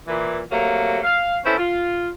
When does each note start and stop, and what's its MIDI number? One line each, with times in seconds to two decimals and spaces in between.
0.07 0.39 46
0.07 0.39 52
0.51 0.99 48
0.51 0.99 54
0.51 0.99 57
0.51 0.99 58
1.03 1.38 77
1.44 1.56 59
1.44 1.56 61
1.44 1.56 64
1.44 1.56 69
1.44 1.56 72
1.58 2.08 65